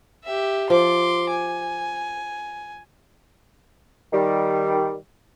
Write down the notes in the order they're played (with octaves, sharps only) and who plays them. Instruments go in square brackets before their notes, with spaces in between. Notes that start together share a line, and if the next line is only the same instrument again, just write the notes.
[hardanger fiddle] G4 E5
[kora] F3 [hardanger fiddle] C6 D6
[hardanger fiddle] G#5
[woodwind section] D#3 G3